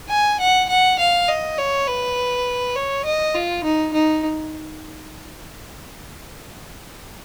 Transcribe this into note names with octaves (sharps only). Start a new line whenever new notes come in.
G#5
F#5
F#5
F5
D#5
C#5
B4
C#5
D#5
F4
D#4
D#4